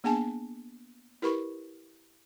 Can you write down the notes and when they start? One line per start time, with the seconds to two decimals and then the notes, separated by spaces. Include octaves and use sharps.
0.04 A#3 B3 D4 G#4 G#5 A5
1.22 E4 G4 A#4 B4 B5 C#6